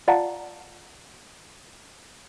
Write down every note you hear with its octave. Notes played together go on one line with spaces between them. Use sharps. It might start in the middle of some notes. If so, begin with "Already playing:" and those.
F4 D5 F5 F#5 A5 A#5